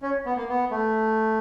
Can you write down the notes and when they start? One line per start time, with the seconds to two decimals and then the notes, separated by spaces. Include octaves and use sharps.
0.02 C#4
0.26 B3
0.36 A#3
0.49 B3
0.71 A3